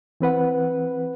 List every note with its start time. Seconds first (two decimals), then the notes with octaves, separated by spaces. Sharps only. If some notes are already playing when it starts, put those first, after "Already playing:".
0.21 E3 C4 B4 F#5